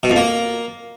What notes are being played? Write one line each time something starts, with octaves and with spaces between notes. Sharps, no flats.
B2
F2
A#3